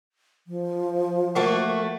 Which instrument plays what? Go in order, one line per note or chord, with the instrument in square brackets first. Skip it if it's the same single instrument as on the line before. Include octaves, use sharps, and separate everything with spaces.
[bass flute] F3
[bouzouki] A3 A#3 F#4